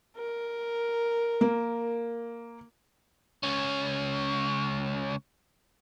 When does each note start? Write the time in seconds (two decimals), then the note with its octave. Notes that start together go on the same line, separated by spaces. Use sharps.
0.17 A#4
1.41 A#3
3.43 C#2 C#4